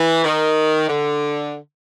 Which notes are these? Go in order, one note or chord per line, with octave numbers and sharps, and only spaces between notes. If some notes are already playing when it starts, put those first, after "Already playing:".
Already playing: E3
D#3
D3